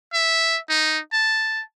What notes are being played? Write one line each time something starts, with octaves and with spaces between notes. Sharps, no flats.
E5
D#4
A5